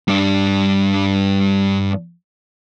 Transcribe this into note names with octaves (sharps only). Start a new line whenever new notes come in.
G2 D4